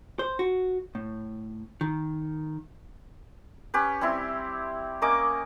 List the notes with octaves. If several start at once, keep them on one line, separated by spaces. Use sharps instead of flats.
C5
F#4
A2
D#3
C#4 G4 B4
G3 C4 E4 C6
A#3 C#4 D#5 D6